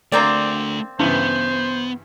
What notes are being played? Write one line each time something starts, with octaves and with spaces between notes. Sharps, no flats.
A3 A#3 C4 D4 D5
G2 C#3 E3 B3 C5